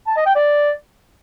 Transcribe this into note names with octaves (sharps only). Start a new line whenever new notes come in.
A5
D#5
G5
D5